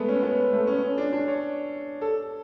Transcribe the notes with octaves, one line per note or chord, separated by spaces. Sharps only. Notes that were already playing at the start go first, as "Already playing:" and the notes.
Already playing: G#3 A3 B3
C#4
B3
A3
C#4
C#4
D4
D4
C#5
A4